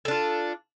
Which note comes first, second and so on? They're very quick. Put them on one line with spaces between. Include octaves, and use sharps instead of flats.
A4 D4 F4